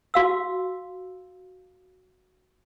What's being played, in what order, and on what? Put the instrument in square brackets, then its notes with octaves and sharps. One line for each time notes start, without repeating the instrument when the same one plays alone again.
[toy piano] F#4 F5 E6